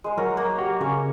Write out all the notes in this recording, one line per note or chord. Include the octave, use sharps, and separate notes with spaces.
G#3 C5
F#3 F#4 A#4
A#3
F#4 G4
C#3 C#4 C#5